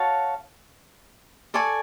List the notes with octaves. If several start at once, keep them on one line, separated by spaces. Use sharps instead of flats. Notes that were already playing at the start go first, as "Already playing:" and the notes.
Already playing: F#4 C#5 F5 A5
A4 D5 G#5 C#6